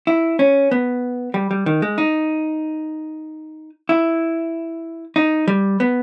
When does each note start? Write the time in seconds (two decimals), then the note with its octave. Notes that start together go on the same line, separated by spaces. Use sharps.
0.07 E4
0.39 C#4
0.71 B3
1.34 G3
1.51 G3
1.66 D#3
1.82 G#3
1.98 D#4
3.89 E4
5.16 D#4
5.48 G3
5.80 B3